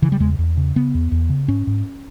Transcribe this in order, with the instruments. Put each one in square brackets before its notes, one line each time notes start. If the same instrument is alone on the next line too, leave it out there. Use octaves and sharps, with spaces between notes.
[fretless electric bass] C#3 E3
G3
E2 G#3
E2
C#3
C#3 B3
E2
E2
C#3
G#2 C#4
G#2